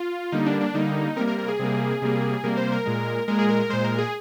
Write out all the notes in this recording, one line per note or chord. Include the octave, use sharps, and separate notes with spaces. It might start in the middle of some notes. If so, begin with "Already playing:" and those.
Already playing: F4
D3 G3 A#3 D#4
D4
D4
D3 G3 A#3 D#4
C3 G3 A#3 A#4
A#4
A#4
G#4
C3 G3 A#3
C3 G3 A#3
C3 G3 A#3 A#4
C5
A#4
A#2 G#3
A#2 G#3 A#4
G#4
A#4
A#2 G#3 C5
A#4
G#4